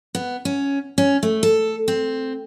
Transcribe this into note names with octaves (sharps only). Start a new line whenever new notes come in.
B3
C#4
C#4
A3
A4
C4